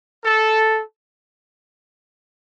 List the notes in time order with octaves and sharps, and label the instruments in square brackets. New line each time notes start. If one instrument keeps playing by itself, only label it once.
[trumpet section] A4